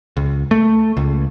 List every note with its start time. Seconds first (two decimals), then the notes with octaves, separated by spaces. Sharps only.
0.17 C#2
0.51 A3
0.97 C#2